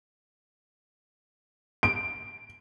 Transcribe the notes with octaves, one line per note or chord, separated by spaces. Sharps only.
D7